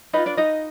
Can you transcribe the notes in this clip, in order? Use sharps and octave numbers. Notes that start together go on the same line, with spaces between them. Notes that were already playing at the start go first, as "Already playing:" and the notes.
D#4 F4 G#4 B4 D#5
D4 D5
D#4 D#5